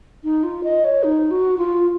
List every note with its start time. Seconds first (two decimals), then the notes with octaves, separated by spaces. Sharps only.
0.24 D#4
0.43 F4
0.64 D#5
0.85 C#5
1.03 D#4
1.31 F#4
1.58 F4